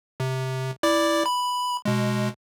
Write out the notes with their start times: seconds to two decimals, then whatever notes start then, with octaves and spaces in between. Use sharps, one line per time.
0.20 C3
0.83 E4 D5 D6
1.26 B5
1.85 B2 G#3